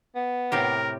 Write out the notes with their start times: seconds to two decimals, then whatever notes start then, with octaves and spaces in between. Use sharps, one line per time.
0.15 B3
0.52 A2 C3 G4 A#4